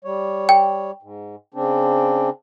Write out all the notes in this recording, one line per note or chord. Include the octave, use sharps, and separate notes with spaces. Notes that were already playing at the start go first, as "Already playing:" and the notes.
G3 C#5
G5
G#2
C#3 C4 D4